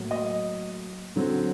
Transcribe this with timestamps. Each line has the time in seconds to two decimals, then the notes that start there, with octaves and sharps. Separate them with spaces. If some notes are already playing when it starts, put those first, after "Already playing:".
Already playing: A2 F#3 A#3
0.11 D#5
1.16 D3 F#3 C4